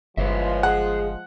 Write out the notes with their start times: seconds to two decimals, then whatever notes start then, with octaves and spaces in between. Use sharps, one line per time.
0.17 G1 F3 G#3 B4 C#5 E5
0.63 G#4 F#5